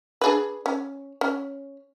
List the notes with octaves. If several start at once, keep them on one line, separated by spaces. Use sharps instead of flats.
D4 G#4 B4
C#4
C#4